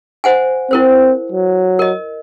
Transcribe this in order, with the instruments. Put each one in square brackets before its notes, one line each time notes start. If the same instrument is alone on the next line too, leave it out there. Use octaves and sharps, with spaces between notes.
[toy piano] C5 F#5 G#5
[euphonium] C4 [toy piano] E4 A#4 C5
[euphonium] F#3
[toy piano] A#4 D#5